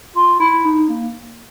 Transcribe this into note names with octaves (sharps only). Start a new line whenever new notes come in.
F4
E4
D#4
A#3